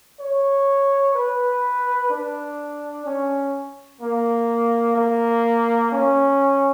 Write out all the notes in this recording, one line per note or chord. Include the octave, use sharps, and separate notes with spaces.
C#5
B4
D4
C#4
A#3
A#3
C#4